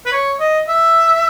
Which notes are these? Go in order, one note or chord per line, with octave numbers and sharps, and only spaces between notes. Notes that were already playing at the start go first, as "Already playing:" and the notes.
B4
C#5
D#5
E5